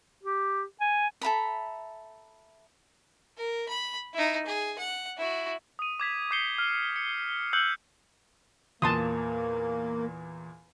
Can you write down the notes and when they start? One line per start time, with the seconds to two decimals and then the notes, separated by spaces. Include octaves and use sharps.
0.24 G4
0.81 G#5
1.21 A4 E5 A#5 B5
3.37 A#4
3.68 B5
4.13 D#4 E4
4.46 G#4
4.78 F#5
5.17 E4 F#4
5.79 D#6 D#7
6.00 D6 G#6 B6
6.31 D6 G6 C7 C#7 G7
6.58 F6
6.96 C#7
7.53 E6 F#6 G6 C#7 F#7
8.82 E2 A#2 A#3 A5 C6 D#6